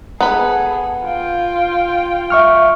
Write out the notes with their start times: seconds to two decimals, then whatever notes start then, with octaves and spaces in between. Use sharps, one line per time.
0.20 B3 G#4 A4 B5
1.04 F4 G5
2.30 E5 C#6 F6